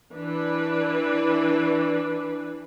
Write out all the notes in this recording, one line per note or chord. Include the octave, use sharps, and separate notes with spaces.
E3 D4 B4